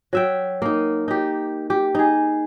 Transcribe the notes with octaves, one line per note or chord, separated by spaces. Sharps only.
F#3 E5 G5
A#3 D#4
D#4 G4
G4
D#4 G#4